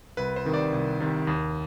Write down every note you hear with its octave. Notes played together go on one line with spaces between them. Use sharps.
C2 B4
C5
C3 D#3
D5
C2
C3 D#3
D#2